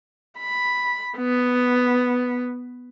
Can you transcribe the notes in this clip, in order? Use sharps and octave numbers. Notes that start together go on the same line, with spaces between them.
B5
B3